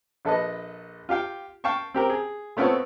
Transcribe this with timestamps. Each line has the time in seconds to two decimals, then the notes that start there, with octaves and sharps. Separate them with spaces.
0.25 A#1 A4 B4 D#5
1.09 F4 G4 F5 G5
1.64 F5 G5 A5 C#6
1.94 C4 G4 A#4
2.10 G#4
2.57 A3 B3 C4 F4 A4 C#5